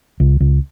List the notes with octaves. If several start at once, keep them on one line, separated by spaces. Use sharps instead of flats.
C#2
C#2